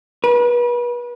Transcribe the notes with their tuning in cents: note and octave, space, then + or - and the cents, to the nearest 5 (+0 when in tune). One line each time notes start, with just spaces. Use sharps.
B4 -35